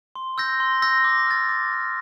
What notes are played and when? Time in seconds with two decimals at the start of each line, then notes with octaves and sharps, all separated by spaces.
0.15 C6
0.38 E6 G6 A#6
0.60 C6
0.82 E6 G6 A#6
1.04 D6
1.27 F6 A6
1.49 D6
1.71 F6 A6